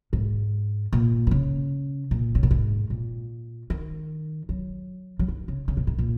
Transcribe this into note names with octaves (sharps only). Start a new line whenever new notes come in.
G#2
A#2
D#3
C#3
A#2
C#3
A#2
G#2
A#2
D#3
F#3
F#3
D#3
C#3
C#3
A#2
G#2
A#2